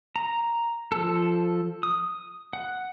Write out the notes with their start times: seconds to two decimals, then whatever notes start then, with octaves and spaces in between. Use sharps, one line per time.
0.16 A#5
0.92 F3 A4
1.83 D#6
2.53 F#5